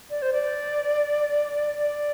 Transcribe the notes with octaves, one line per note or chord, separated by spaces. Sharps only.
D5
C5
D5
D5